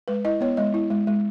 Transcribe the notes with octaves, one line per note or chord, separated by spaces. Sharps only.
G#3 B4
E4 D#5
B3 C#5
G#3 D#5
E4
G#3
G#3